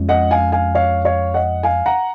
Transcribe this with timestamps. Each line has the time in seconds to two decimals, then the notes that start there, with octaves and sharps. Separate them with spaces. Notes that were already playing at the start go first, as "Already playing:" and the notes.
Already playing: F2 G#3 C#4
0.09 D#5 F#5
0.31 F5 G#5
0.52 F5 G#5
0.75 C#5 F5
1.05 C#5 F5
1.34 D#5 F#5
1.63 F5 G#5
1.86 F#5 A#5